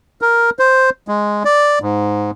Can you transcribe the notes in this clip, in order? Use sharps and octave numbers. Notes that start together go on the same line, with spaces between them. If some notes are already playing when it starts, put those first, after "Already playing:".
A#4
C5
G#3
D5
G#2